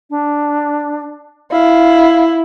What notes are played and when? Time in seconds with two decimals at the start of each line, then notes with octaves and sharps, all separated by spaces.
0.10 D4
1.52 E4 F5